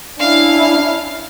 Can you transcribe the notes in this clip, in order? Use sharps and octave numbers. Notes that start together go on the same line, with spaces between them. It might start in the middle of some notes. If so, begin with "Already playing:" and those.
C#4 D4 E4 F5